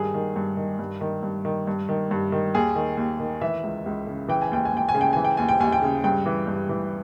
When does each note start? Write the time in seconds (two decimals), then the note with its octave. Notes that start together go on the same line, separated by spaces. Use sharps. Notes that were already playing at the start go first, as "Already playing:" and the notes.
Already playing: G2 D#3 G#4
0.14 D#3
0.36 G2
0.57 D#3
0.79 G2
1.01 D#3
1.23 G2
1.45 D#3
1.67 G2
1.89 D#3
2.11 G2
2.32 D#3
2.54 D#2 G#4
2.75 D#3
2.97 D#2
3.20 D#3
3.41 E3 E5
3.63 C#2
3.86 C#2
4.07 C#3
4.28 E3 G5
4.42 G#5
4.52 D#2 G5
4.65 G#5
4.73 D#2 G5
4.89 G#5
4.94 C#3
5.01 G5
5.13 E3 G#5
5.25 G5
5.37 D#2 G#5
5.49 G5
5.60 D#2 G#5
5.72 G5
5.82 C#3
6.04 G2 G5
6.26 E3
6.47 G2
6.69 E3